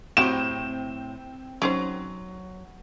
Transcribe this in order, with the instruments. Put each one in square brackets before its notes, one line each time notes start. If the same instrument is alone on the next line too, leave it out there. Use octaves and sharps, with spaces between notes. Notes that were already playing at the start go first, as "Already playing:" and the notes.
[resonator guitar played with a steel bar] A2 C5 [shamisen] F#3 F#4 G4 [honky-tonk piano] C4 G6 [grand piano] E7
[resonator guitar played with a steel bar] F#3 [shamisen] C#4 D#4 C5